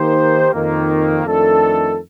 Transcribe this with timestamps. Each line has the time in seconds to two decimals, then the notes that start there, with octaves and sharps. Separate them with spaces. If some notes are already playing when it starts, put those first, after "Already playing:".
Already playing: D#3 A#3 D#4 G4 C5
0.51 F2 D#3 A#3
1.25 F2 D#3 A3 D4 A4